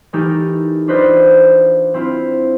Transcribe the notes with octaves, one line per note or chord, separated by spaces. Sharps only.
E3 A3 D#4 G4 A4 A#4
D4 F4 B4 C5 D5 D#5
C4 E4 F4